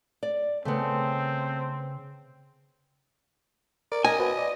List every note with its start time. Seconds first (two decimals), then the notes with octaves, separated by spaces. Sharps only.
0.23 D5
0.65 C#3 A3 B3 C4
3.92 A#4 D5
4.05 A#4 D#5 G#5
4.20 F#4 B4 C5
4.38 D5